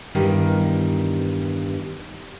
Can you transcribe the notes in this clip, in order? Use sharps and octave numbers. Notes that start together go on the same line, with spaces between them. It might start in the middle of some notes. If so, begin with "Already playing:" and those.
E2 G2 D#3 G3